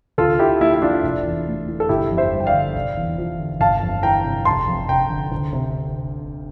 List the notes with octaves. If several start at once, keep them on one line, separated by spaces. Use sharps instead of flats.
D2 F4 A4
D3 E4 G4
A#3 E4
E4
F3 D4 F4
F1
E2
A3
E3
A4
G1 E4 G4
F2
C5 E5
G3
G5
D5 F5
D3
F1
E2
F3
D3
G1 F5 A5
F2
E3 G5 A#5
C3
F1 A5 C6
F2
F1 G5 A#5
D3
D2
C3